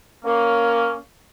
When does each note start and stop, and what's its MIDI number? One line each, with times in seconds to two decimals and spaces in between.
0.25 0.95 58
0.25 0.95 61